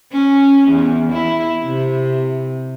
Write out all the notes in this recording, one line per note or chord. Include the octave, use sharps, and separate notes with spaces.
C#4
E2
E4
C3